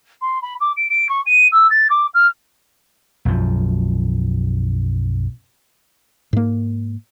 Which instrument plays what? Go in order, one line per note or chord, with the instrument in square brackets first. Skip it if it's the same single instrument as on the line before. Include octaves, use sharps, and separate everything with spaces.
[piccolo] C6
B5
D6
D7
D7
C#6
D#7
E6
A6
D6
F6
[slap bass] B1 F#2 F3
[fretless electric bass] G#2 A#3